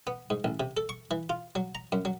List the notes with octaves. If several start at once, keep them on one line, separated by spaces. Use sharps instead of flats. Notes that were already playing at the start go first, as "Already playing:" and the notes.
B3
G#2
A1
C3
A4
C#6
E3
F4
F#3
A#5
F#2
F#3